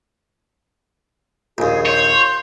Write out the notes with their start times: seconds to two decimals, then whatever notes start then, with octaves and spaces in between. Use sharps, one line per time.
1.58 A#1 D#2 G#4
1.86 C#5 C6 G6